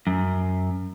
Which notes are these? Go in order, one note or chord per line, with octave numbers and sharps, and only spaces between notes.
F#2